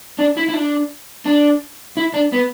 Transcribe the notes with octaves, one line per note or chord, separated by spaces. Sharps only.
D4
E4
E4
D4
D4
E4
D4
B3